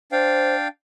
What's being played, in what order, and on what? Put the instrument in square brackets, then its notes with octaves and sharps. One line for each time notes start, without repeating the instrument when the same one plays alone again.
[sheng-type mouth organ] D4 F5 G5 [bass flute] C5